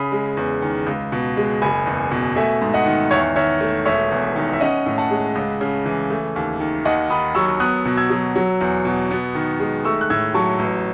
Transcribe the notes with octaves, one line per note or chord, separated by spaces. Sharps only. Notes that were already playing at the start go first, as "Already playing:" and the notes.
Already playing: C#3 B5 D#6
G#3
E2
D#3
C#2
B2
G#3
F#1 G#5 B5
E2
B2
A3 E5 G#5
G#2
D#5 F#5
D#3
E2 C#5 E5
D#3 C#5 E5
A3
E1 C#5 E5
E2
D#3
E5
C#4 D#5 F#5
A2
F#5 A5
G#3
C#2
C#3
E3
A3
D#2
D#3
D#2 D#5 F#5
D#3 B5 D#6
F#3 C#6 E6
B3 D#6 F#6
B2
E6 G#6
F#3
F#3
E2
B2
B3
D#3
G#3
A3 C#6 E6
F#6
A2 E6 G#6
F#3 A5 C#6
A1